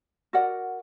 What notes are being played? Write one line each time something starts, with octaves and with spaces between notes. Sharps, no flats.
F#4 A#4 D5 F#5